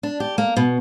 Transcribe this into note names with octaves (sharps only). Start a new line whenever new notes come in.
D4
G4
A#3
B2